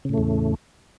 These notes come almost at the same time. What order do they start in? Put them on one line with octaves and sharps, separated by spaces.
C#3 A2 A3 E2